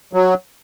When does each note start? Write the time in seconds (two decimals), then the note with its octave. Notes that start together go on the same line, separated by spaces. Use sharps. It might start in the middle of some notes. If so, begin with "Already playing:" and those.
0.13 F#3